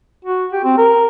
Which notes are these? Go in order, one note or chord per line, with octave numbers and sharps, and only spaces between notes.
F#4
G4
C4
A#4